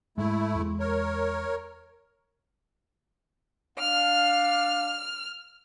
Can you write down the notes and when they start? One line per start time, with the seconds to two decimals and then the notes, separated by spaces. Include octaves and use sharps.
0.18 G#2 G#3 A3 E4
0.55 E2 G#3
0.80 A#4 C#5
3.78 D4 F5 F6